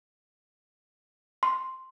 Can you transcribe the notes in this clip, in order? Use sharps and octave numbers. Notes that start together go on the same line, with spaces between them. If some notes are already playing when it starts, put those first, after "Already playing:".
C6